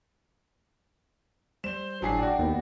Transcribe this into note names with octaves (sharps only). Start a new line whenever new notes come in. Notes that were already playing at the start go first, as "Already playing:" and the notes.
G3 C5 E7
G1 A2 F#3 D4 E4 G#4 C7
F#4 D5 G5
D#2 B3